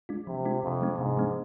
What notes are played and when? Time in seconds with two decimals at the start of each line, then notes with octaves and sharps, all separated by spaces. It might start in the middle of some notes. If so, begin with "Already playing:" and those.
0.09 G#3 D4 F4
0.27 C3 F3
0.45 G#3 D4 F4
0.63 F2 C3
0.81 F3 G#3 B3 D4
0.99 G#2 C3
1.17 F3 G#3 B3 D4